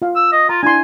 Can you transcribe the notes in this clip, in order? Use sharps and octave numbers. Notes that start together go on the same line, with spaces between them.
F4 F5
E6
D#5
F4 A#5
D4 E4 G#5 C6